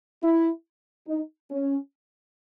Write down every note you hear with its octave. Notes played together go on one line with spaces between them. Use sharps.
E4
D#4
C#4